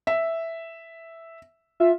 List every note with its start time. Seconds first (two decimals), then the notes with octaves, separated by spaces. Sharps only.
0.07 E5
1.80 F4 E5